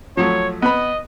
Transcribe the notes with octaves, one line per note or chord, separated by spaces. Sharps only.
F3 F#3 A3 C#5
B3 B4 D#5 B5